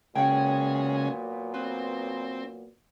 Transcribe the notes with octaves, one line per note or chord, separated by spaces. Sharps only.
A#2 C#3 F#3 G#3 B3 F#5 G5
C4 B4